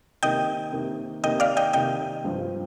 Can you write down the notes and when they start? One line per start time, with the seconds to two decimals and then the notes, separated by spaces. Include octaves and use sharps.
0.23 C3 D#3 A#3 D#5 G5
0.73 C3 D#3 A#3
1.23 C3 D#3 A#3 D#5 G5
1.40 D5 F5
1.57 D#5 G5
1.73 C3 D#3 A#3 D#5 G5
2.24 G2 F3 C4 F4